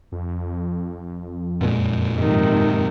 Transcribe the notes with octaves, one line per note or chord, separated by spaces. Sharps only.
F2
F#2 A#2 G#3
G#2 C3 D#3